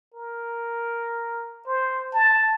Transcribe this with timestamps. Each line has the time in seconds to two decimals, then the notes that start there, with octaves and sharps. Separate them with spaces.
0.14 A#4
1.67 C5
2.13 A5